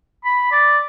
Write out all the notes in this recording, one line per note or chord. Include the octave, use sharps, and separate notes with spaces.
B5
D5